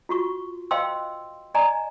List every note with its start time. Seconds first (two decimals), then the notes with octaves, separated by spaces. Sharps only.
0.09 F4 F#4 C#6
0.71 C5 D#5 F5 G5 C6 E6
1.55 D5 D#5 G#5 A#5